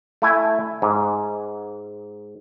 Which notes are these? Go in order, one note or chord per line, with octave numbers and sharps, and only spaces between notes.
A3 E4 G#5
G#2